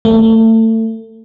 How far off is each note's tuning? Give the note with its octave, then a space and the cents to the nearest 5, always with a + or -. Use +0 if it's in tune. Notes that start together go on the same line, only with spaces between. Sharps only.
A3 +30